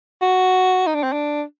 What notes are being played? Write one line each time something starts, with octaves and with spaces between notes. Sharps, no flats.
F#4
D#4
D4
C4
D4